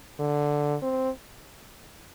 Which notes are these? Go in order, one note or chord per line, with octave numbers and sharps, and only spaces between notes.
D3
C4